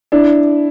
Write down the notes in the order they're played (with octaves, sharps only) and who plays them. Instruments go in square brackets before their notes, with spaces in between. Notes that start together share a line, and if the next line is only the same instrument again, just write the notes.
[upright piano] D4 E4